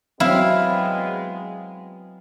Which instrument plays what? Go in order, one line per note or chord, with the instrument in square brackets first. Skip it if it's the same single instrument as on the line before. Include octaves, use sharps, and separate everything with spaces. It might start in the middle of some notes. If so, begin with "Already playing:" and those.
[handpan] F#3 C4 [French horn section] G#3 B3 [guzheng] E4 [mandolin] A#4 F5